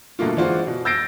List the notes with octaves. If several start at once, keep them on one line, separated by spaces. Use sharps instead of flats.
G2 B2 A3 A#3 F4
E3 G#3 D4 F4 F#4 C5
B2
E6 G6 A6 A#6 C7 D7